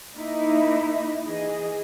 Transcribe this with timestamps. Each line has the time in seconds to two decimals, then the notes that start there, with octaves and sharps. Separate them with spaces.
0.16 A#3 D#4 E4
1.24 E3 G#4 D#5